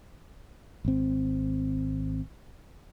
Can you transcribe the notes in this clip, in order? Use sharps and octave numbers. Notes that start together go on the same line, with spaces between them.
G#1 C4